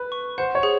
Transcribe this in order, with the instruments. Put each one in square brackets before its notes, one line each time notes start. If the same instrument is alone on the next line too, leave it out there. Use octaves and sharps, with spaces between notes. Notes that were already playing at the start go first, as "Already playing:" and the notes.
Already playing: [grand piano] B4
[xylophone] C#6
[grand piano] C5 [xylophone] F#5
[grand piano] C#5
[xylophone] G#4